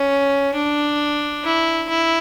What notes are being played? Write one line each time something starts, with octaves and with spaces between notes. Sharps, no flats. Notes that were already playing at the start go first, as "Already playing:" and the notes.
Already playing: C#4
D4
E4
E4